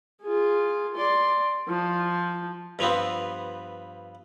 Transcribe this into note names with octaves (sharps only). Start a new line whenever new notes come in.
F4 G#4
D5 C6
F3
G2 F3 B3 C4